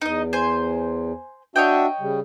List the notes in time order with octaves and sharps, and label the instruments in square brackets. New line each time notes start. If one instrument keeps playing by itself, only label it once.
[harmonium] E2 [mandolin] D#4 D#5
[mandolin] C5 G#5
[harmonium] D4 F#4 E5 [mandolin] C#5 D#5 G5
[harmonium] C#3 G3